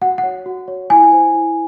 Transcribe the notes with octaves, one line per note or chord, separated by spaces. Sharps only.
F#4 F#5
F#5
C#5
F#4
C#5
E4 G#5
C5
E4